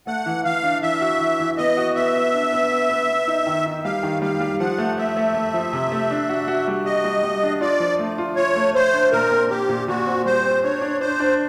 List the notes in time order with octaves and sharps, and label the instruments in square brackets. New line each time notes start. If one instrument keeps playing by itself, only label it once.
[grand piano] A3 [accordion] F#5
[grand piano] E3
[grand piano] E3 [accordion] F5
[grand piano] D4
[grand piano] E3 [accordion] E5
[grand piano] F#4
E3
E3
[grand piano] B3 [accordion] D#5
[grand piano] F#4
[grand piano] B3 [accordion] E5
[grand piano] B3
D4
B3
B3
B3
B3
D#4
D#3
D#4
[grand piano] G3 [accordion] F5
[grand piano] D#3
[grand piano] G3 [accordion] F5
[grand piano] G3
[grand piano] F3 [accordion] F#5
[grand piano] A3
[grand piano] A3 [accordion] E5
[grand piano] A3
A3
F3
C3
A3
D4
F#4
F#4
G3
[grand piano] F#4 [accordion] D#5
[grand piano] G3
G3
D4
[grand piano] F4 [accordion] D5
[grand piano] F3
A3
F4
[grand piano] F4 [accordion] C#5
[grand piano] A3
[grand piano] A3 [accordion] C5
[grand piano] D4
[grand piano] A#2 [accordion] A#4
[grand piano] C4
[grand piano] C4 [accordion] G4
[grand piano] A#2
[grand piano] A#2 [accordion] F#4
[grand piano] C4
[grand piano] G3 [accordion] C5
[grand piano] C4
[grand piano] D4 [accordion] C#5
[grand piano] D4
[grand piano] D4 [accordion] C5
[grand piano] D4